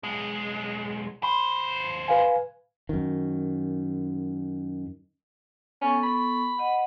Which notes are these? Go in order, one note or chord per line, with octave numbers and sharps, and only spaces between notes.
B1 G#3
D#2 C5 B5 C6
B4 F5 G#5
F#2 D#3
B3 C#4 A4 C#6
B5
D#5 F#5